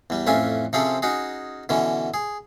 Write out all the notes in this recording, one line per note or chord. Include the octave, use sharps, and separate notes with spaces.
E2 G3
A1 F2 C#4 F4 E5 G#5
C3 F3 C4 C#4 G#4 A4
C#4 D#4 F#4 G#4
B2 D3 E3 C#4
G#4